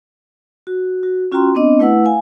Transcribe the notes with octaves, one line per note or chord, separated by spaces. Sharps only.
F#4
F#4
C#4 F4 F#4 G5 A#5 C6
B3 C4 D4 D#5
A3 E4 B4 F#5 E6
F5 G#5